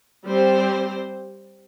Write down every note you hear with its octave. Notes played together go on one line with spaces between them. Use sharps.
G3 C4 G4 C5